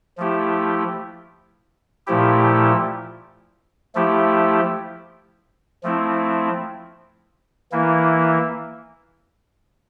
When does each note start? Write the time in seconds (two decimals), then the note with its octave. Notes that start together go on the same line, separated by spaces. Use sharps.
0.17 F3 A3 E4 G4
2.07 A#2 F3 A3 E4 G4
3.95 F3 A3 E4 G4
5.83 F3 A3 C4 E4
7.72 E3 A#3 E4